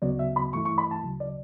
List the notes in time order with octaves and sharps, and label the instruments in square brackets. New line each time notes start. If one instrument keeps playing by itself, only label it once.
[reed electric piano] D2 C#3 F#3 B3 F#4 [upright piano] D5
[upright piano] E5
B5
[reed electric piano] G2 E3 A3 E4 [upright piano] C#6
[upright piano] C#6
B5
A5
[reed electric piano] D2 C#3 F#3
[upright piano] D5